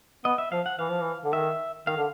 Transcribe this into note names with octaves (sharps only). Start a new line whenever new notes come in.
B3 D#5
E5
F3 F5
F#5
E3 F5
F3
E3
D3
D#3 E5
D#3 F5
D3